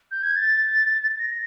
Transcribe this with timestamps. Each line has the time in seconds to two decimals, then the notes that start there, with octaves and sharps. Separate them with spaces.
0.11 G6
0.23 G#6
0.35 A6
1.19 A#6